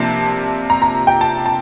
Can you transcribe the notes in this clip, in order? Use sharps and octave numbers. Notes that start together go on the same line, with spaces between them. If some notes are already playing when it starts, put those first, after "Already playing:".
Already playing: C3 F3 A#3 D4 A5
A#5
A#5
G5
A5
A5